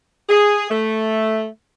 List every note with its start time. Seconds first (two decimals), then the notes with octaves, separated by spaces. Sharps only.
0.29 G#4
0.70 A3